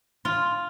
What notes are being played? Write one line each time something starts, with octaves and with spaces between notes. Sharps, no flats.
F4